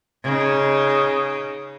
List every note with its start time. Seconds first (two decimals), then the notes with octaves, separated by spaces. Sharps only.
0.24 C#3 D#4